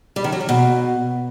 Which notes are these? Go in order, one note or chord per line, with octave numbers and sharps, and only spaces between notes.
G3
D#3
F#3
D#3
B2